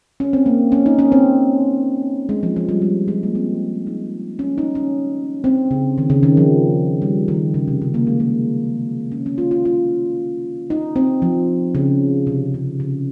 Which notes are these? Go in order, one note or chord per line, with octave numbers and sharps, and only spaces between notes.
C#4
C4
A#3
C#4
D#4
C#4
C4
G#3
F3
F3
G3
G#3
G#3
A#3
C4
D#4
C#4
D#4
C#4
C4
C#3
D#3
C#3
D#3
F3
G3
D#3
C#3
C3
C#3
A#3
G#3
A#3
C#4
C#4
F4
F4
F4
D#4
C4
F3
C#3
C3
C#3
C#3